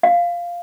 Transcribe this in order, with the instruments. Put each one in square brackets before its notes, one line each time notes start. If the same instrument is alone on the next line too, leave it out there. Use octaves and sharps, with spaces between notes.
[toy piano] F5